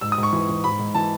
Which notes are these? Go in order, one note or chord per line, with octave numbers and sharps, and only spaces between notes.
G#2 E6
D#6
G#2
C#6
E3
E3
G#2 B5
G#2
E3 A5